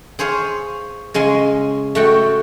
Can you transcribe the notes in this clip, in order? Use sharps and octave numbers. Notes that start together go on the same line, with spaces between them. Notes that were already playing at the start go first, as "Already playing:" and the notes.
G#4 C5 C#5 F5
C#3 G#3 G#5 C6
A3 F#4 G5